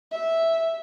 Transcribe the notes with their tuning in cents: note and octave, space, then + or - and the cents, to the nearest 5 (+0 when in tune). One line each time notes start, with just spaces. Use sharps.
E5 -5